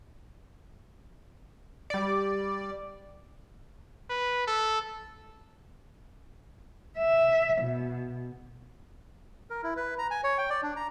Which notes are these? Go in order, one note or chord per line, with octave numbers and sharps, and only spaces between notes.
G3 D5
B4
A4
E5
B2
A#4
E4
B4
A#5
G#5
C#5
G5
D5
D4
A#5